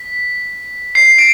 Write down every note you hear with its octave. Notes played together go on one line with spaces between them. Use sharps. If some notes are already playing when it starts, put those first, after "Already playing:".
Already playing: B6
C7
D7